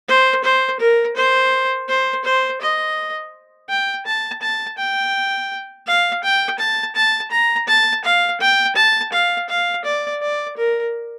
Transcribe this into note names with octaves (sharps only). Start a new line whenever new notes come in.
C5
C5
A#4
C5
C5
C5
D#5
G5
A5
A5
G5
F5
G5
A5
A5
A#5
A5
F5
G5
A5
F5
F5
D5
D5
A#4